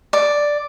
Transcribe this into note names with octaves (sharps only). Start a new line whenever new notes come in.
D5